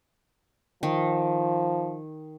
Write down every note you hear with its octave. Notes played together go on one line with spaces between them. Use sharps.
D#3 F3